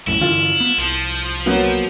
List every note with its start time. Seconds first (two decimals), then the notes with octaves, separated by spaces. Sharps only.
0.07 C2 F#2 A2 E4
0.21 G1 D3 E3 F4
0.60 B3
0.78 C2 F3
1.46 F#3 A#3 B3